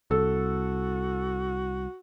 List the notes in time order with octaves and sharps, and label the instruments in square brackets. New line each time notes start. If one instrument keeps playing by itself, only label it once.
[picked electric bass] C2 [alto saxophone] F#4 [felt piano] A4